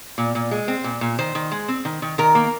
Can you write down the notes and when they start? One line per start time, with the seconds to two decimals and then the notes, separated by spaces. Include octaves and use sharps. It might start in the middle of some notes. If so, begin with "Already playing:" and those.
0.18 A#2
0.35 A#2
0.51 G#3
0.68 C4
0.84 A#2
1.01 A#2
1.19 D#3 C5
1.35 D#3
1.52 G#3
1.68 C4
1.85 D#3
2.02 D#3
2.18 D#3 A#4
2.35 A#3